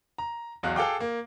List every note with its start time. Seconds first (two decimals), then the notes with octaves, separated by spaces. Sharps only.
0.18 A#5
0.63 B1 E2 F5 F#6
0.76 G#4 A4 F5 G5 D6
1.00 A#3